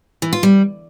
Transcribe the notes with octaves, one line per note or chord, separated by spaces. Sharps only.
E3
F4
G3